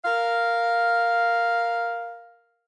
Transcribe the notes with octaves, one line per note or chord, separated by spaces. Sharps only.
A#4 F5